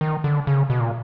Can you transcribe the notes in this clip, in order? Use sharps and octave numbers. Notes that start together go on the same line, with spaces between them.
D#3
D3
C#3
B2
A#2